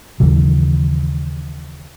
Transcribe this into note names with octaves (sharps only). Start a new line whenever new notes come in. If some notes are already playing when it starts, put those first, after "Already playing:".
D#2 C#3 E3 F#3